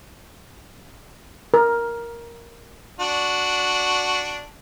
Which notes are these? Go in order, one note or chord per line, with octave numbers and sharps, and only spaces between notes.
A#4
D4 F#4